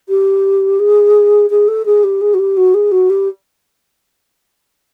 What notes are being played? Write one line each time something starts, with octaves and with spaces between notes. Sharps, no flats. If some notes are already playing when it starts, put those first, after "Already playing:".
G4
G#4
G#4
A4
G#4
G4
G#4
F#4
G4
F#4
G#4
F#4
G4